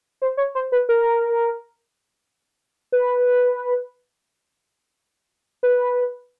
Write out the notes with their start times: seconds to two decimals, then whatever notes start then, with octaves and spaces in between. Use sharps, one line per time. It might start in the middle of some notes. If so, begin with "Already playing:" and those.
0.22 C5
0.37 C#5
0.55 C5
0.72 B4
0.89 A#4
2.92 B4
5.63 B4